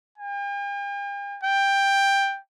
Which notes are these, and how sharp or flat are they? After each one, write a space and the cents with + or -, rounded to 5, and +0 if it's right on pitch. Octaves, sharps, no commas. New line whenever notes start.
G5 +45
G5 +10